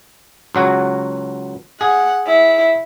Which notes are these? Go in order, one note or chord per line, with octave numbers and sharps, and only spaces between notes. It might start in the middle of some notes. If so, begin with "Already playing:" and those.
C#2 F#3 F#4
G#4 F#5
E4